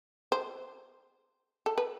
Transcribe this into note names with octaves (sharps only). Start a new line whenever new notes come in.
C5
A4
B4